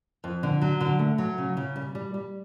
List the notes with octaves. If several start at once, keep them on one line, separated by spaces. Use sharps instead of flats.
F2
D3
F#3
D3
A3
F#3
C#3
C#3
G3
G3
G3